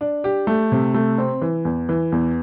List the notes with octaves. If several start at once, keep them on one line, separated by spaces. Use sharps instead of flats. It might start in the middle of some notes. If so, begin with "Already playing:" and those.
D4
G4
A3
C3
A3
C4
E3
E2
E3
E2